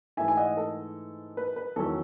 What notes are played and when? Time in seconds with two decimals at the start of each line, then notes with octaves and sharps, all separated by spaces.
0.17 G#2 E3 A3 E5 G#5
0.28 G#5
0.37 D#5 F#5
0.57 A4
1.37 B4
1.56 B4
1.76 E2 D#3 F#3 C#4 A4